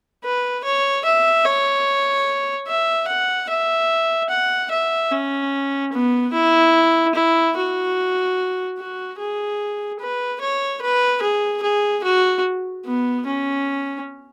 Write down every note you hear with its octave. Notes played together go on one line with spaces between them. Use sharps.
B4
C#5
E5
C#5
E5
F#5
E5
F#5
E5
C#4
B3
E4
E4
F#4
F#4
G#4
B4
C#5
B4
G#4
G#4
F#4
B3
C#4